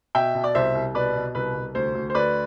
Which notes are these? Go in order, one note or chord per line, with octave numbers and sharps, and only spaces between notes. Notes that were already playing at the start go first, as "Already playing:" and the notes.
B2 E5 G5
B2
D5
C2 C5 E5
C2
B2 B4 D5
B2
C2 B4
C2
D2 C5
D2
C5
D2 B4 D5